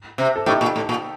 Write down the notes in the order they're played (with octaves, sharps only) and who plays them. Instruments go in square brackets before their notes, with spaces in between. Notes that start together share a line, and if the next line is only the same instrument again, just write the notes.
[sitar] C3
[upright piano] A4
[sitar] A2 [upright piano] D#4 G4
[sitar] A#2
A2
A#2